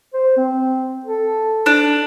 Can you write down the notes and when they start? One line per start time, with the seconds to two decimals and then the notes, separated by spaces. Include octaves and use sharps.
0.13 C5
0.37 C4
1.06 A4
1.66 D4